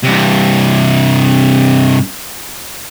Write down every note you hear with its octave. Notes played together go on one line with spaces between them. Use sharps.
G2 C3